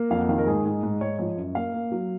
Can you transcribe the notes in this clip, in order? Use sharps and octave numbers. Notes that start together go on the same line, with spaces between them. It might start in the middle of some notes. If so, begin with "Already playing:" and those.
Already playing: A#3
F2 F5
F#5
D#3 F5
A#4
G#2 G#4
G#2 G#4
G#2
G#2 C#5
F3 C#5
F#2
A#3 F5
A#3
F#3